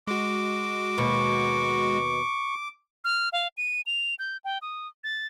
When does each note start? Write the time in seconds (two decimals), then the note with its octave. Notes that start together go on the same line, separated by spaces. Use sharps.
0.07 G#3 F#4 D6
0.98 D#2 B2 C#6
3.04 F6
3.33 F5
3.57 D#7
3.86 F7
4.19 G6
4.44 G5
4.62 D#6
5.04 A6